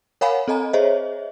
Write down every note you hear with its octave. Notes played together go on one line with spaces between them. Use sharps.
A#4 C#5 F5 F#5 G#5 B5
C4 A4 D#5 G#5 A#5
G#4 C5 C#5 D#5 E5